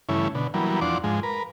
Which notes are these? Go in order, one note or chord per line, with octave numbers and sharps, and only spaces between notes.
G2 C#3 E3 A3 C#4 E4
B2 D3
E3 F#3 G3 A#3 B3
E2 F3 D4 F#5 C6 D6
G#2 F3 G#3
A#4 B4